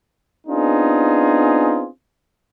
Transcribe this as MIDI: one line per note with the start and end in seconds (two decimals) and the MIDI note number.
0.47 1.87 59
0.47 1.87 60
0.47 1.87 62
0.47 1.87 63
0.47 1.87 65
0.47 1.87 68